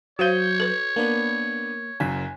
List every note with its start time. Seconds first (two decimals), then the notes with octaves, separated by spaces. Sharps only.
0.19 F#3 F#4 C5 C#5 F5 G6
0.60 A4 B4
0.96 A#3 B3 D4
2.00 F#1 F#2 G#5 B6